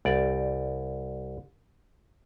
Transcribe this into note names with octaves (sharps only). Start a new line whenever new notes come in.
C2 D5